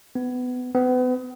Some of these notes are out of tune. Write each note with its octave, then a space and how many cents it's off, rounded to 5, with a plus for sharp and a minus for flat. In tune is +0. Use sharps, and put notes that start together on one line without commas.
B3 +20
B3 +35